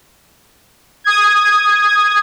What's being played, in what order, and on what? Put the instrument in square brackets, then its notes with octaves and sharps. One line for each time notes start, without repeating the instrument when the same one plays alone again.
[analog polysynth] D#6 G#6